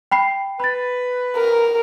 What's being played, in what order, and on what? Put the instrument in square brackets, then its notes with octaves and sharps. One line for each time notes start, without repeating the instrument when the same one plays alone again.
[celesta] G5 B5 C7
[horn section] B4 [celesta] B5 A6
[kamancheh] A#4